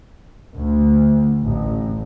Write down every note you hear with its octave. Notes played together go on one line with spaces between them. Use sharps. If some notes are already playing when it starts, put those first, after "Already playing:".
D2
A1